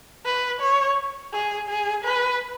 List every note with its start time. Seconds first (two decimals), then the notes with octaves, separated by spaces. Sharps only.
0.25 B4
0.60 C#5
1.33 G#4
1.69 G#4
2.04 B4